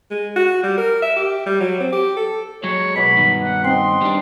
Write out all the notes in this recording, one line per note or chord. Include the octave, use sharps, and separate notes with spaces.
G#3
F#4
G3
A#4
E5
G4
G3
F#3
C4
G4
A4
F#3 G#3 C#5
B2 B5 D6
G2 D#3
F#5
C4 D#4 C6
G3 D4